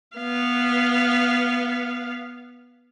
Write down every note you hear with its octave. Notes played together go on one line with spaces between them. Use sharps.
B3 F5